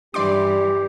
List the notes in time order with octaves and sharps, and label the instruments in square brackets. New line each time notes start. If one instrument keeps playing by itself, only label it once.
[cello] G2 E3 [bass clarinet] G4 [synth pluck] D5 C6 D6